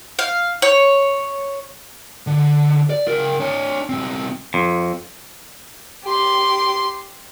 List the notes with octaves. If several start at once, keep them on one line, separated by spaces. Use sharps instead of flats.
F5
C#5
D3
D5
C#3 A#4
D4 C#5
B1 C4
F2
G4 C6